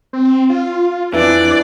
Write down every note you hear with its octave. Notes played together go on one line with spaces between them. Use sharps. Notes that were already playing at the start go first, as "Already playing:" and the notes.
C4
F4
F2 E3 D4 D5